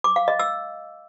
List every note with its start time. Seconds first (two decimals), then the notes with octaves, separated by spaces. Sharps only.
0.04 D6
0.16 F5
0.28 D#5
0.39 E6